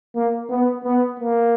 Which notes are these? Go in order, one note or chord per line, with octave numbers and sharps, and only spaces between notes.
A#3
B3
B3
A#3